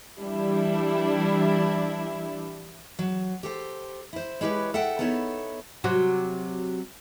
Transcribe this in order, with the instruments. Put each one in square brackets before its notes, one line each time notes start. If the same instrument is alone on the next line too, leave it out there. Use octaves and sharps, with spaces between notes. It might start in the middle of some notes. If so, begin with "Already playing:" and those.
[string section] E3 G3 D4 E4
[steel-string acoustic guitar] F#3
G4 A4 C5
E4 C5
G#3 E4 G4 B4 C#5
A4 E5 F#5 G5
B3 D#4 E4 A4 C#5
[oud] C3 F#3 F#4